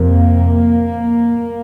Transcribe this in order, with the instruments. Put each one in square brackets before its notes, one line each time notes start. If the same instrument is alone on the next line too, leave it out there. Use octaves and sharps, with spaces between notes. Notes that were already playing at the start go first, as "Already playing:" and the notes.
Already playing: [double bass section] F2 C3 A#3